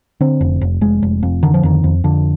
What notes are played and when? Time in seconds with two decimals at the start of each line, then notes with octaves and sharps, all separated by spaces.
0.21 D3 C4
0.41 F1
0.61 F1
0.81 F1 G#3
1.02 F1
1.23 F2
1.43 D3 D#3
1.54 F3
1.63 F2 D#3
1.84 F2
2.04 F2 D3